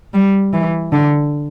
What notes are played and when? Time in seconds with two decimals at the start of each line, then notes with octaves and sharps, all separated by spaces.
0.14 G3
0.53 E3
0.92 D3